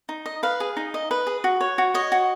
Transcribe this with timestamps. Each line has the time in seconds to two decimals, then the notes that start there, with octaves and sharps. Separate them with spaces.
0.09 D#4
0.26 D#5
0.43 B4 F5
0.60 G#4
0.77 D#4
0.94 D#5
1.11 B4
1.27 G#4
1.44 F#4
1.61 C#5
1.78 F#4
1.94 C#5 D#5
2.12 F#4